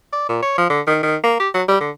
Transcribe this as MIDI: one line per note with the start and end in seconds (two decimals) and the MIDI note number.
0.13 0.26 74
0.29 0.38 46
0.43 0.55 73
0.58 0.67 53
0.70 0.81 50
0.87 1.01 51
1.03 1.16 51
1.24 1.37 58
1.40 1.49 67
1.55 1.63 54
1.69 1.79 55
1.81 1.90 50